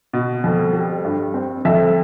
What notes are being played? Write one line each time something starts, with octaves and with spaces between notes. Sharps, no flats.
B2
F2
G3
G2
C4
F2 E5